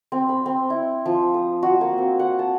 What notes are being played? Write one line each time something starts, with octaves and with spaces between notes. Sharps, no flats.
C4
B5
C4
E4
F3
D#6
F#4
A#3
C4
F#5
A5